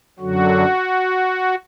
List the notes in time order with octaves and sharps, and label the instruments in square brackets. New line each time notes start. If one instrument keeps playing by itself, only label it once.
[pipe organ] F#2 D3 F#3 F#4